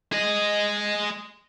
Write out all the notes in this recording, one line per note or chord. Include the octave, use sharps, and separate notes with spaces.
G#4 D#5